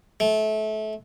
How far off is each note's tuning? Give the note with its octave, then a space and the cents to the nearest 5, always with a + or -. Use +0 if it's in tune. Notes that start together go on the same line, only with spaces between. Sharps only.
A3 -25